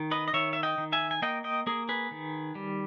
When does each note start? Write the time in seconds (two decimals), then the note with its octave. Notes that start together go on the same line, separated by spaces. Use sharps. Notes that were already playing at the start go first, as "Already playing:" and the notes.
Already playing: D#3
0.11 B4 D#5
0.28 D#5
0.33 D#3 C#5 E5
0.53 E5
0.63 D#5 G5
0.78 D#3
0.92 E5 G#5
1.11 G#5
1.22 A#3 D#5 G5
1.44 D#5 G5
1.67 A#3 G#4
1.89 G#4 B4
2.11 D#3
2.55 G3